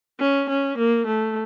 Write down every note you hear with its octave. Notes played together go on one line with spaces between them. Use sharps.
C#4
C#4
A#3
A3